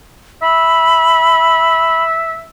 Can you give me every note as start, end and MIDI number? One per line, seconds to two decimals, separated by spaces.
0.42 2.46 76
0.42 2.04 83